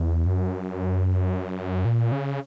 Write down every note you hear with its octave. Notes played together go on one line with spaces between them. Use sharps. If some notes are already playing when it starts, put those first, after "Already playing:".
Already playing: E2
F#2
A#2
C#3